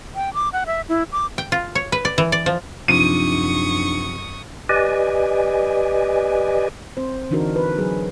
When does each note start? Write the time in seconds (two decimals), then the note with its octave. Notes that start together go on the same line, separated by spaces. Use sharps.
0.15 G5
0.34 D6
0.53 F#5
0.66 E5
0.89 E4
1.12 D6
1.38 G5
1.52 F4
1.75 C#5
1.92 B4
2.05 D5
2.18 E3
2.32 D5
2.46 F3
2.88 F#2 C3 F3 D4 D#4 C#6 D#6 D#7
4.69 G4 B4 D5 D#5 G#5
6.97 C4 C5
7.30 D3 E3 D4 D#4 F#4 A#4
7.56 B4
7.78 F#3 G#4